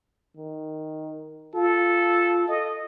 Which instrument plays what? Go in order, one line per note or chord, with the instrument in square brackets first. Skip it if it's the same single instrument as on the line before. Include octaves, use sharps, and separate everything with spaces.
[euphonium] D#3
[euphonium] F4 [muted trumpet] A4
[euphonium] A4 [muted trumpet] D#5